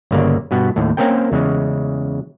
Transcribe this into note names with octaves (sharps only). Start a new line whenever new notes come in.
G1 C#3 A#3 D5
G2 B2 B3
D#2 A2
A#3 C4 C#4 A#4 G5
E2 C#3 G#3